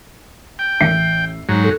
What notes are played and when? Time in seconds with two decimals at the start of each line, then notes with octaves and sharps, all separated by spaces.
0.59 G5
0.81 A1 E5 C7
1.49 G#2 F#3 A#5
1.64 A4